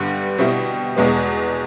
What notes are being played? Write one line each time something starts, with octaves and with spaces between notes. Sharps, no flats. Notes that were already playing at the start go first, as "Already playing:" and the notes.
Already playing: G2 D3 G3 B3
B2 G3 C4 E4
E2 B2 G#3 B3